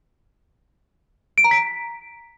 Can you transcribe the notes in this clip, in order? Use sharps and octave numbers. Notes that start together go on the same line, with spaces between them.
D7
A#5
B6